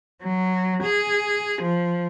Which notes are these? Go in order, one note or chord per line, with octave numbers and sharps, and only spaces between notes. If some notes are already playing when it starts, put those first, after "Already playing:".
F#3
G#4
F3